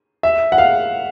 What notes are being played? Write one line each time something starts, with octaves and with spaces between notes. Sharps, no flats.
E5
F#5
F5